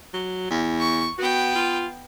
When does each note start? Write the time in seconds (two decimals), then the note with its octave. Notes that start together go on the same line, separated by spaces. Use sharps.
0.14 F#3
0.50 E2
0.79 C#6
1.18 B3 F#4 G5
1.56 F4